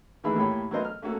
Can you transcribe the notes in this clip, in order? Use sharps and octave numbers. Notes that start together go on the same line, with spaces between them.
D#2 D#3 E3 A3 G#4 B5
A2 A#3 G4 C#5 B5
F#3 A3 B3 A#4 C5 D#5
F6
A3 A#3 C#4 F#4 A4